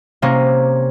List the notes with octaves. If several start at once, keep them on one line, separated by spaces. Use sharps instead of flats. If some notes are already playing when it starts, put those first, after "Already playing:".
C3 A#3 C#4